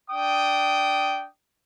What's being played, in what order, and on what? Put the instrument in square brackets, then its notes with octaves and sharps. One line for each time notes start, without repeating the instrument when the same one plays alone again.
[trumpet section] D4 G5 D#6